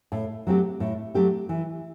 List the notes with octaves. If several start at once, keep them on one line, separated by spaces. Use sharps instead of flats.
A2
F#3 A3 C4 G4
A2
F#3 A3 C4 G4
E3